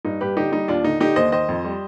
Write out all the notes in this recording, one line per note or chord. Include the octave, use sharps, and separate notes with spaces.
G2 D#4
G2 G4 B4
D3 D#4 G4
G3 D#4
D#2 D4 F4
D3 D#4
D3 D#4 G4
D#2 C5 D#5
D#3 C5 D#5
F2
G3